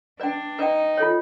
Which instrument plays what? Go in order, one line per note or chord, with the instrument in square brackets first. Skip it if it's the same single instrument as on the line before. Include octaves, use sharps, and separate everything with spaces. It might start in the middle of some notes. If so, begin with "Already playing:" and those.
[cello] D4 [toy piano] B4 D5 G5
[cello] D#4 [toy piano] B4 D5 G5
[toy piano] F4 A4 C#5